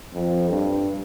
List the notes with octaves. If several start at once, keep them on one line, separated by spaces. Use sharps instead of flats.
F2
G2